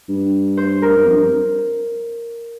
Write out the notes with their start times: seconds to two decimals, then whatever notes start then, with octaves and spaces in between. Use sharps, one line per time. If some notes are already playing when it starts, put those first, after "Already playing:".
0.09 G2
0.57 C5
0.82 A#4
0.96 G2
1.06 F2
1.18 G2